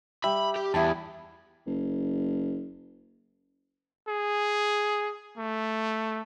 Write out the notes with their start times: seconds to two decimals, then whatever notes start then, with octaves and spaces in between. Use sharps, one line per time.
0.24 G3 E5 B5
0.56 G4
0.74 E2 G3 B3 E4 A5
1.67 F#1
4.08 G#4
5.37 A3